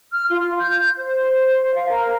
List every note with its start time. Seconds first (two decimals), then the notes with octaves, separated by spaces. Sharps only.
0.12 F6
0.31 F4
0.58 G6
0.98 C5
1.74 F5
1.90 A#4